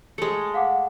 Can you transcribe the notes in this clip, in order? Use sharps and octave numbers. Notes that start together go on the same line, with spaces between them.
G#3 A3 C#7
F5 F#5 D6